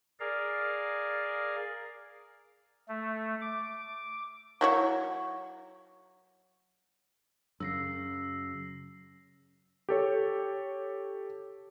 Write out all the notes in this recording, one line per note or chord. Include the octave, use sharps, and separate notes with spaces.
G#4 A#4 D5 F5
A3
D6
F#3 E4 C#5
F#2 C#3 E6 A#6 C7
G4 A4 C#5